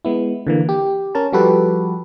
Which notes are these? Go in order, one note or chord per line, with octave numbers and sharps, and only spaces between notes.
G#3 B3 E4
D3 E3 A#3
G4
C#4 A#4 C#5 A5
F3 G3 F#4 G4 A4 B4